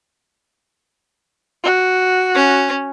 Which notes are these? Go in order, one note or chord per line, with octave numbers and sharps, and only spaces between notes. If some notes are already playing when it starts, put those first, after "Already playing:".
F#4
C#4